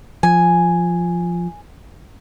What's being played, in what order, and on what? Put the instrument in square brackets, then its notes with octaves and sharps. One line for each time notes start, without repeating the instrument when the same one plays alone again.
[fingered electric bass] F3 [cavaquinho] G#5